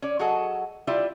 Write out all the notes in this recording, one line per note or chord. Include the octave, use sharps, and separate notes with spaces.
C#4 D5
F#3 F#4 G#4 A4 D#5
G3 E4 F4 D5 E5